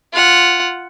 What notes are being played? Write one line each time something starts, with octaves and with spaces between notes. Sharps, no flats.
F4 F#5